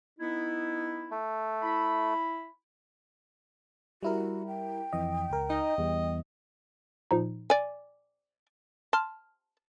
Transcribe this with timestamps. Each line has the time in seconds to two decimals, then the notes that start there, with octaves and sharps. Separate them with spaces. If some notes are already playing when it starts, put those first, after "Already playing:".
0.19 B3 D#4 E4
1.11 A3
1.62 E4 B5
4.03 G3 E4 F#4 A#4
4.47 G5
4.93 F2 E3 D#5
5.30 C#2 A#4
5.50 D#4 D#5
5.78 E2 G3
7.11 A#2 F3 D#4
7.50 D5 G#5
8.93 A5 C6 F6